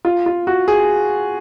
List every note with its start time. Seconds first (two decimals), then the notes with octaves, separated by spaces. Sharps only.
0.05 F4
0.26 F4
0.47 F#4
0.68 G#4